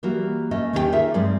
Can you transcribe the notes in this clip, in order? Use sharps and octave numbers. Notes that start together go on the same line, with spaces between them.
E3 G3 A#3 F#4
A3 C#4 D#5
D#2 D#3 C#4 E4 G4 G5
D#4 F4 G#4 A#4 E5
G2 F3 G#3 C4 D5